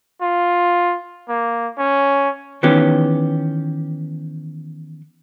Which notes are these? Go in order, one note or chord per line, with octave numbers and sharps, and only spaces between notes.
F4
A#3
C#4
D#3 E3 B3 C#4 G4